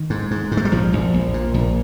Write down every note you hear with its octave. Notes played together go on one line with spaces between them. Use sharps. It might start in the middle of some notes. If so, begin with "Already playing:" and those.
Already playing: D#3
G#2
G#2
G#2
G#3
G3
A#1 F3
A#1
A#1
A#2
A#1